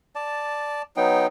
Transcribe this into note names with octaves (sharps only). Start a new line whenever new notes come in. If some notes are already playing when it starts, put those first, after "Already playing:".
D5 A5
F#3 B3 D#4 G5